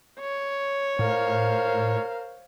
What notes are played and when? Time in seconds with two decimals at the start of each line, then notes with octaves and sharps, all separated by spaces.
0.20 C#5
0.99 A2 A#4 C5 F5